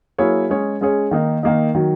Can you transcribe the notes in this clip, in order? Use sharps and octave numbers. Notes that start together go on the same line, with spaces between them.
F#3 A#3 E4 G#4 C#5
G#3 C#4 G#4 C#5
G#3 C#4 G#4 C#5
D#3 A#3 D#4
D#3 A#3 D#4
D#3 F#3